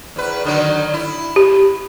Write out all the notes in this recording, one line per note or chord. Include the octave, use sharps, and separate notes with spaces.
E2 B4
D3 D#3 F#3
E4
G4